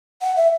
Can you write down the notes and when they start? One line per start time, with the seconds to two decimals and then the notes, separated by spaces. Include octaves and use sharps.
0.22 F#5
0.36 E5